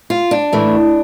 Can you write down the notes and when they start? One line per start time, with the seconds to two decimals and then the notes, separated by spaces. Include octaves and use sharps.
0.10 F4
0.31 D4
0.53 A2 E3 A3